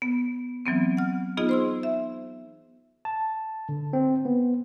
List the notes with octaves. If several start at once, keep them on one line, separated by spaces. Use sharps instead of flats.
B3
E3 F#3 B3 C4
F#5 F6
B3 D#4 F4 G#4 D#5
C5 C6 E6
E5
A5
D3
C4
B3